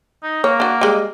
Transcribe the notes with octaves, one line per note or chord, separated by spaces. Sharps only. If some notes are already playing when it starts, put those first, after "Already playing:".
D#4
A#3 C#5
D4 F#4
G3 G#3